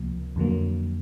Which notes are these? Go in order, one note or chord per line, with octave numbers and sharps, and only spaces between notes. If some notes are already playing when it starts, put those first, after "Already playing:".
Already playing: C#2 C3 F3 A#3
F2 D3 F#3 A#3